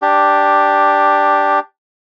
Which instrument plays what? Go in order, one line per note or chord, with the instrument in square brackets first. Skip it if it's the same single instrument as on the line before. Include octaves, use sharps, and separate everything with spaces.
[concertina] D4 G4